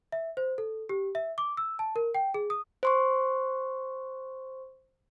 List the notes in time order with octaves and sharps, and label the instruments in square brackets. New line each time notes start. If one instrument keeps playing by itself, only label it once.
[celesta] E5
C5
A4
G4
E5
D6
E6
A5
A#4
G5
G#4
D#6
[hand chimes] C5 C6 C#6